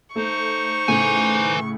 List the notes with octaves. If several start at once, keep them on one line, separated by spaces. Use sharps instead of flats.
A3 D#4 C5 C#6
A2 C#3 B4 G#5